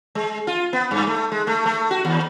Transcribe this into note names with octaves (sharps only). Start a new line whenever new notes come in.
G#3
F4
B3
G2
A3
G#3
A3
A3
F#4
D#2